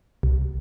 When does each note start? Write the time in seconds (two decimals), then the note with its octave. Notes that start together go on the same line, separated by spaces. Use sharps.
0.23 C2